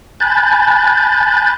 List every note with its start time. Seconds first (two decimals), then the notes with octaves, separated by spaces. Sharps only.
0.20 G#5 A5 B5 F#6 G6 A6